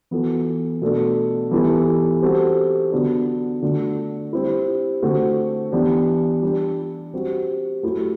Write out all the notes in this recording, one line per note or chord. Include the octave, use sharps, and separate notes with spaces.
E3 B3 F#4 A4
B2 A3 D4 A4
E3 G3 B3 E4 A4
G3 C4 F#4 A4
D3 F#3 B3 D4
D3 A3 D4 F#4
G3 C4 E4
D3 A3 C4 F#4
E3 B3 D4 G4
G3 D4 G4
G3 C4 F#4
F#3 A3 E4 G4